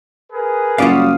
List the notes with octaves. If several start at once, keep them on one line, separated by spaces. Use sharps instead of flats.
G#4 A#4 B4
F#1 G3 F4 F#4 F5 D6 D#6